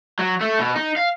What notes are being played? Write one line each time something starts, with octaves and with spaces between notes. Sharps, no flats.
F#3
A3
B2
D#4
F5